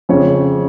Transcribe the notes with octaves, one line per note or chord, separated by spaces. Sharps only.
F2 C#3 C#5